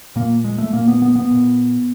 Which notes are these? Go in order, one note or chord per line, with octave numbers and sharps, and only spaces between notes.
A#2 A#3
G#3
A3
A#2 A#3
B3
B3
B3
A#2